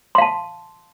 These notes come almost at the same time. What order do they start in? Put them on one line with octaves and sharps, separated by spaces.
C6 F5 A5